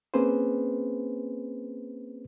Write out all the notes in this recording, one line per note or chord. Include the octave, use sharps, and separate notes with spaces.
A#3 C4 C#4 G#4 B4 C5